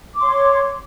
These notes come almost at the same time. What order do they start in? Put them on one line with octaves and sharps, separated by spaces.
D6 C6 C#5